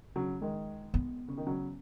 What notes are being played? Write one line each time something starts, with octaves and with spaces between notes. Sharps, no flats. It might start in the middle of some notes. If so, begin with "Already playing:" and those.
C#3 F#3
D#3 G#3
B3
C#3
D#3
C#3 F#3